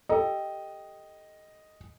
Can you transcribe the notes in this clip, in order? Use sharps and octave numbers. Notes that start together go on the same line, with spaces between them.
G4 A4 D#5 A#5